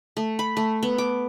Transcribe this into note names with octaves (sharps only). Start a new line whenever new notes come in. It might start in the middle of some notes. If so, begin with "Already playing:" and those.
A3
B5
A3
B3
D6